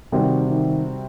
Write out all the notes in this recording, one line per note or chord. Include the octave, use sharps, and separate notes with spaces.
C3 D#3 G3 C4 F#4
D#3